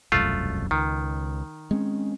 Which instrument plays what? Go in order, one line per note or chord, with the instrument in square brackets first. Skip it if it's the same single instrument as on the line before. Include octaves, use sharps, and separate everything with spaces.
[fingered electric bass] E1 C2 F#2 [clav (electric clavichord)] A3 F4
[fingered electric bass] C#2 [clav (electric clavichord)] D#3
[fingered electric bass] G#3 C4 C#4